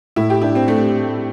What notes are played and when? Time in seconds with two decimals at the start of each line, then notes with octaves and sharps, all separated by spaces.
0.16 A2 E4
0.30 G4
0.41 D4 E4
0.55 C4
0.68 A3 D4